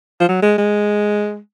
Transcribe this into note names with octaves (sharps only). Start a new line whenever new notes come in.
F3
F#3
G#3
G#3